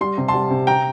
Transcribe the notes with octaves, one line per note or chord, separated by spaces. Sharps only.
G3 C6
C3
A5 C6
G3
C3
G5 A#5